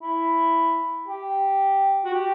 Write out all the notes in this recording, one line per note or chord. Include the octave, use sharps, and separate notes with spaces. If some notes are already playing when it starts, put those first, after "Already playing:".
E4
G4
F#4
G4